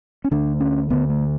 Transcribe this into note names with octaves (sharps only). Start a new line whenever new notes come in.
C#4
D2 D3 D4
C#4
D2 D3 B3
A3